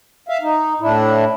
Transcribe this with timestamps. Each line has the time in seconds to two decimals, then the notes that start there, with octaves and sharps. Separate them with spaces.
0.29 E5 F5
0.42 D#4
0.81 A2 D4 E4